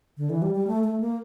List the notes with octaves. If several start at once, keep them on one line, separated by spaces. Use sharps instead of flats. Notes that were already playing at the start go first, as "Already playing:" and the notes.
D3
E3
G3
G3
A3
A3
A#3